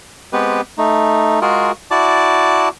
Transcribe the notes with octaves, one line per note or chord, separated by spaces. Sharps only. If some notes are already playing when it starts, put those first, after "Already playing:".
G#3 B3 C4 G4 B4
A3 D#4
G#3 F4 F#4 G#4 A#4
E4 F#4 D5 A5 D6